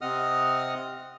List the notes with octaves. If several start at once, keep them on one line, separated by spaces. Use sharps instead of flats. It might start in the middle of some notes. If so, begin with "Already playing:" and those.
C3 C4 D#5 F#5 D#6 F6